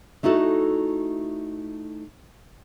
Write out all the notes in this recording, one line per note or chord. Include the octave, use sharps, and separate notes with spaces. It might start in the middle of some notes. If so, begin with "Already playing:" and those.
A3 D#4 E4 F#4 A4